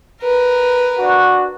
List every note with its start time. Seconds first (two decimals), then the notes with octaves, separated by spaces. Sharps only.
0.21 A#4 B4
0.98 D4 F#4